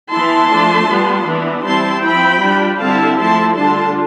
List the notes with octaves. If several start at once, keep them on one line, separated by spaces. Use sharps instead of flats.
E3 B3 E4 A5 C6
F3 A3 D4
G3 B3 F4
E3 B3 D4
G3 C4 E4 A5 C6
F3 C4 E4 G5 B5
G3 D4 F4
D3 G3 C4 E4 F5 A5
F3 A3 E4 A5 C6
D3 G3 D4 F4 A5 C6